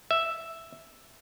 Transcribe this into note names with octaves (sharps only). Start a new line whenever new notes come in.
E5